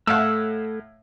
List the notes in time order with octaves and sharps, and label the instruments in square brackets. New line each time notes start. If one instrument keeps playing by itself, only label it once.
[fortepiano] A2 F5 F#5 [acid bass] A3 [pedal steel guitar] E6